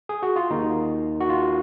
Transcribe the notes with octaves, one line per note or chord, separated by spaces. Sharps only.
G#4
F#4
F4
D#2 D#3 D#4
F#4
F4